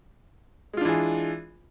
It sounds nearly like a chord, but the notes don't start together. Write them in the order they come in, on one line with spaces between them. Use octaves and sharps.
G#3 F4 D4 E3 G#4